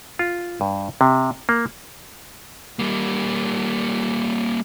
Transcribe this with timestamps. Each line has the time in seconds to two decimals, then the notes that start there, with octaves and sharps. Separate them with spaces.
0.19 F4
0.61 G2
1.01 C3
1.49 A#3
2.79 G3 A#3